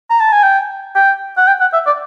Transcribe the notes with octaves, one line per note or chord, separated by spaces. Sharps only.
A#5
A5
G#5
G5
G5
F#5
G5
F#5
E5
D5